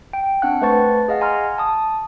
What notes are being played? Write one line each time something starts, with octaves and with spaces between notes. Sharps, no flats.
G5
C4 D4 F#5 F#6
A3 B4 C5 A5 C#6 A6
G#4 D#5 F5 F#5
G#5 A#5 C6 F6
A5 D#6